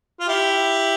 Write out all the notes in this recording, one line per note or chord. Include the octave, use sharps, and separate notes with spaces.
F4
E4 G4